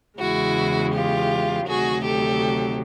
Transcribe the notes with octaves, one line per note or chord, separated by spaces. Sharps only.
E2 C#3 E3 G#3 E4 F#4
F4 G4
D2 C3 D#3 F#3 F#4 G#4
G4 A4